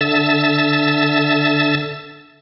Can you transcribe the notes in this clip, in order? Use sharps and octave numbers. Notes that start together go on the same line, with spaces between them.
D3 E5 A5 E6 A6